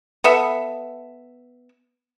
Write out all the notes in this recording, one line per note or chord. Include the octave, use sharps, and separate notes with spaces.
B3 A4 E5